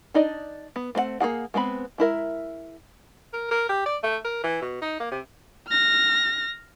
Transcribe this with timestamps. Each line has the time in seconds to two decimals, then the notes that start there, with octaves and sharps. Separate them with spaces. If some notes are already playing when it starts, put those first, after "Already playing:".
0.14 D4 D#4 D5 D#5
0.76 B3
0.95 A3 C4 A#4 F#5
1.20 A#3 F#4 G#4 F#5
1.54 G#3 B3 C4 B5
1.98 G#3 E4 A#4 E5
3.34 A#4
3.51 A#4
3.69 G4
3.86 D5
4.03 A3
4.24 A#4
4.43 E3
4.62 B2
4.82 D#4
5.00 A#3
5.11 C3
5.68 F6 A#6